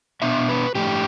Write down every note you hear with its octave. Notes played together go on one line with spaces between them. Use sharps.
B2 B3 D4 E5
B4
A2 A3 D4 G4